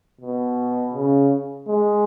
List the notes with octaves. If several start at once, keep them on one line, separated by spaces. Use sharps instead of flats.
B2
C#3
G#3